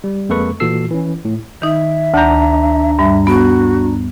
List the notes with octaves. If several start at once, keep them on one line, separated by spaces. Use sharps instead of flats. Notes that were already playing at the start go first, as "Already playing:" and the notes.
G3
F2 G#3 A#3 A4 B4 C#6
A#2 E3 F#4 A4 E6 C7
E3 C#4
A2
D#3 D#4 E5
D2 D4 A#5 G6
G2 G3 E5
B3 F#4